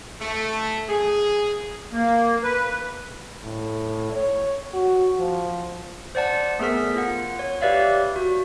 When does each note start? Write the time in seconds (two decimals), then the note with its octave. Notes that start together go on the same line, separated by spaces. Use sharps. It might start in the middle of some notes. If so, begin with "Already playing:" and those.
0.21 A3
0.89 G#4
1.92 A#3
2.43 B4
3.44 A2
4.12 C#5
4.74 F#4
5.19 F3
6.15 C5 D5 F#5 A5
6.59 A3 B3 G#4 A#4 B6
6.96 F4 F#5
7.39 C#5
7.61 G4 B4 C#5 D5 E5 F5
8.16 F#4